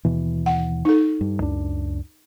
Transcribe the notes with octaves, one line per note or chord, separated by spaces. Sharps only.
D#2 B2 E3
F#5
D#4 A4
G2
C#2 F#2 D4